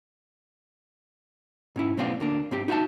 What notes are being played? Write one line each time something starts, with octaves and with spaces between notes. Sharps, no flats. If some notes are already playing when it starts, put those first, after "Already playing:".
G#2 C#4 E4
B1 A2 B3 C4 D5 F5
D2 A#3 D4
G#2 C4 G4
D#4 F#4 E5 F5 A5